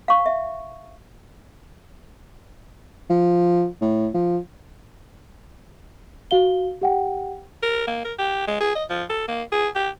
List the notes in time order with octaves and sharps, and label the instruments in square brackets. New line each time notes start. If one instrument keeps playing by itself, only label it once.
[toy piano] F5 C#6
E5
[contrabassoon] F3
A2
F3
[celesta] F#4 F5 G7
G4 F#5 G5
[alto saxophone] A#4
A#3
A#4
G4
G#3
G#4
D#5
F3
A4
A#3
G#4
G4